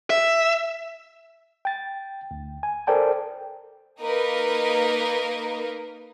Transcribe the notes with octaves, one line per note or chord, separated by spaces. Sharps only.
E5
G5 A6
D2
G#5
A4 A#4 C5 D5 G5 A5
A#3 D#4 A#4 B4